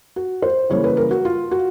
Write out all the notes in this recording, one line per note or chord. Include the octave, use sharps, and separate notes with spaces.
F#4
C5
C#3 E3 G3 A#3 C#5
B4
A#4
F#4
F4
F#4